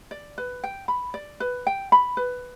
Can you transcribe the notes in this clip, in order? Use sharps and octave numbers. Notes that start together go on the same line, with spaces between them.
D5
B4
G5
B5
D5
B4
G5
B5
B4